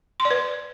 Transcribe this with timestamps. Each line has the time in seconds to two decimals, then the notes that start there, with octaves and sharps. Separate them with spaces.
0.20 C6
0.25 D5
0.31 B4